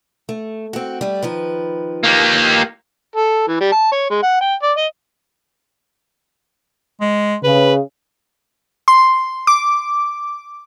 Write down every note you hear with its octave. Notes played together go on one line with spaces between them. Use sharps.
A3
C4 F#4
G3 A3
D#3 F3 B4
A#3 G4
A4
E3
G3
A5
C#5
G#3
F#5
G5
D5
D#5
G#3
C#3 B4
C6
D6